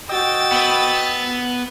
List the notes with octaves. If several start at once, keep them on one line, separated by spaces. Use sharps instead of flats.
F#4 D#5 G5 E6 A6
B3 B4